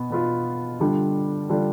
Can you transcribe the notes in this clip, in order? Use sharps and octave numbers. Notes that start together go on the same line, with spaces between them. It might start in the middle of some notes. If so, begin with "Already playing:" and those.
Already playing: B2 B3
B2 B3 F4
D3 G3 D4 F4
D3 G3 D4 F4